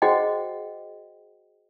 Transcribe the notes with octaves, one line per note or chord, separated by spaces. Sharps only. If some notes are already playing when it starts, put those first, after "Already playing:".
F#4 G#4 C5 D#5 F#5 G5